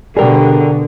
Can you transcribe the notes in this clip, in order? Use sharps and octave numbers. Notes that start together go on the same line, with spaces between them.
B2 D3 G3 G#4 A#4 G5